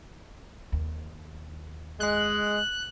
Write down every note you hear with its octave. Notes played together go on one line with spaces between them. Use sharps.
D#2
G#3 F#6